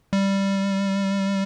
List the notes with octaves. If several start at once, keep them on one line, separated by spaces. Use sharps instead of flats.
G3